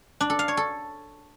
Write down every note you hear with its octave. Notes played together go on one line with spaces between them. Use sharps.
D4
A4
F5
C#5
A4